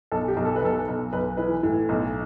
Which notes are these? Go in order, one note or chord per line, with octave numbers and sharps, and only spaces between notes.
B1 A4
G4
B1
A4
B4
B1 A4
B1
B1 B4
E3 B4
A2
B1